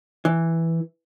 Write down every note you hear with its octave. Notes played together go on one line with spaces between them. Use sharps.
E3